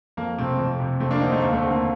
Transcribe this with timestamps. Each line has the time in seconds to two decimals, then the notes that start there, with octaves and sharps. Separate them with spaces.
0.17 F2 A#3
0.38 C3 A3 C4
0.59 F2
0.80 C3
1.00 F2 A3 C4
1.11 A#3 D4
1.21 D3 C4 D#4
1.32 A3
1.42 D#2 A#3
1.52 A3 C4
1.62 D3 A#3
1.72 A#3